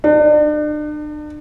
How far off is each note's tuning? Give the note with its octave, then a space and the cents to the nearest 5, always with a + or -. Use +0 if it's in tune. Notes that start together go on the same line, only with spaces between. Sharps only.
D4 +40